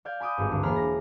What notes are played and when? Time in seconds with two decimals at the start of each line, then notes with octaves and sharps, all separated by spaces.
0.05 D5 F5 G6 G#6
0.20 G#5 B5 D6 D#6 G6
0.38 G#1 G2
0.52 D2
0.63 E1 A#3 G#4 B5 F6
0.76 A#6